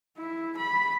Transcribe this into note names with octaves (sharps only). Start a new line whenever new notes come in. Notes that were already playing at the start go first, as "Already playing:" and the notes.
E4
B5